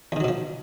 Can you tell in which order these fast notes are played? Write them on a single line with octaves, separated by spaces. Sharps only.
E2 D#3 F#3 B2 F3